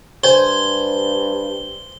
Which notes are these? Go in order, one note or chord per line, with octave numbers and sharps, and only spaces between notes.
G2 C5 G#5 G7